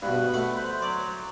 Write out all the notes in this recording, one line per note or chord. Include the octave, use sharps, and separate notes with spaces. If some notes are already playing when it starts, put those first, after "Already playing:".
G2 B2 B4
A3 F#5 B5
C5
F#3 D5